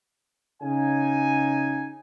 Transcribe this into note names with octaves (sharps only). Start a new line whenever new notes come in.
C#3 D#4 G#5